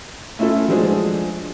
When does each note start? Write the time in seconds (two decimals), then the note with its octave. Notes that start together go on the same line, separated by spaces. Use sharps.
0.39 A3 C#4 E4 F4 A4
0.68 F3 F#3 G#3 D4 G#4 C5